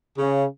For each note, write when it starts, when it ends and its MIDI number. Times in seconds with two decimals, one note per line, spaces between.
0.18 0.44 49